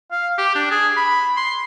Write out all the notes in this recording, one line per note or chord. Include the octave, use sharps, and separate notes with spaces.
F5
G4
D4
G#4
B5
C6